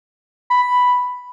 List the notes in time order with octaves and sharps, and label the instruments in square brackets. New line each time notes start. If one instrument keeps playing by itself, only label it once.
[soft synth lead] B5